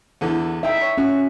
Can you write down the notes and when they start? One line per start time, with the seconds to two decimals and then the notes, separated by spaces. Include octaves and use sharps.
0.21 E2 D3 E3
0.63 D#4 E4 E5 G5
0.81 C#5
0.98 C#4 F#4